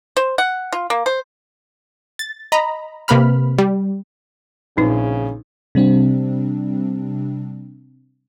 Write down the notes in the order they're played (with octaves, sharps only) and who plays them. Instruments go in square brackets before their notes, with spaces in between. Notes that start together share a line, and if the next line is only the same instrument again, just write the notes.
[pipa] C5
F#5
F4
A#3
C5
[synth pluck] A6
D#5 A#5 B5
C3 A#3 B4 B5 F6
G3
[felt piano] A#1 [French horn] C#3 [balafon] C4 D#4 B4
[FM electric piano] C3 G3 C4 D4